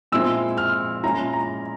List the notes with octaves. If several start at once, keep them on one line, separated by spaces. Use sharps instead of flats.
A#2 G#3 C4 E4 E6
F6
A#2 G#3 C#4 E4 A#5
A#5